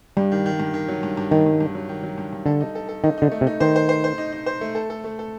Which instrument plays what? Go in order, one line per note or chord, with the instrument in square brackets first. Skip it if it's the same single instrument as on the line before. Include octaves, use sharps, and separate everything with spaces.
[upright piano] G2 [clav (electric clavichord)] G3
[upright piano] D#3
D#3
G2
D#3
F#3
G2
G2
[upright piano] G2 [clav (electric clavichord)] D#3
[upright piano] G2
G2
F#3
D#3
F#3
G2
G2
[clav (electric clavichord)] D3 [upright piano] A4
[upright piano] D#4
A4
A4
[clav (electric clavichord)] D#3 [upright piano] D#4
[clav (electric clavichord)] D3 [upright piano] D#4
[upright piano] A3
[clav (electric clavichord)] C3
[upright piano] D#4
[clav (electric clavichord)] D#3 [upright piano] C5
[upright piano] C5
C5
C5
D#4
D#4
C5
A3
A4
A4
A3
A4